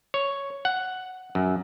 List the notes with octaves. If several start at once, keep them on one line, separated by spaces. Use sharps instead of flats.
C#5
F#5
F#2